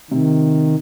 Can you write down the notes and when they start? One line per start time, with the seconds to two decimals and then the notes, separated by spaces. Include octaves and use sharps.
0.11 C3 D#3